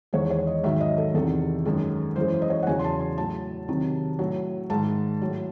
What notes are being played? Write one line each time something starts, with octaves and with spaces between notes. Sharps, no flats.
E2 D#3 G#3 C#5
C#5
D#5
G#2 D#3 F#3 E5
D#5
A4
E2 C3 D#3 A4
F#2 D#3 G#3
F#2 E3 G#3 C5
C5
D#5
C#5
F#5
E2 C#3 F#3 G#5
C6
A5
C6
A2 F#3 A5
C3 D#3 F#3
A2 F#3
G#2 D#3 G#3 A5
A2 F#3